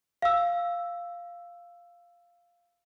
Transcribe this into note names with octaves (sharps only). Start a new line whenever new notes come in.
F5 E6